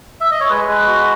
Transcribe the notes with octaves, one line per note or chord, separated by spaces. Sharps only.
E5
D#5
C#5
G#3 B4
G#3
F#4